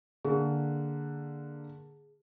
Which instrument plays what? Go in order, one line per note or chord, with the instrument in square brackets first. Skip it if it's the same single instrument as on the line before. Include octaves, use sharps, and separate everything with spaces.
[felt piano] D3 A#3 [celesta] G#4